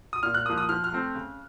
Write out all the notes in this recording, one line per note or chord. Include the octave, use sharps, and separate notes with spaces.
D#6
A#2 F6
F#6
F3 A#3 D#6
D#6
F3 F6
F6
A3 C4
C#3